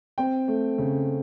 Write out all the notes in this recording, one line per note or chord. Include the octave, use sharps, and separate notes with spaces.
C4 G5
A3
C#3